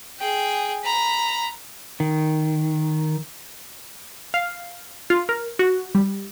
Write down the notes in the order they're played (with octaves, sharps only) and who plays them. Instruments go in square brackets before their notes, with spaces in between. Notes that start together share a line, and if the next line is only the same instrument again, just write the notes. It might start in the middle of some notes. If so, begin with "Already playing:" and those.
[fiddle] G#4 G5
A#5 B5
[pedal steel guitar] D#3
[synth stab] F5
F4
A#4
F#4
G3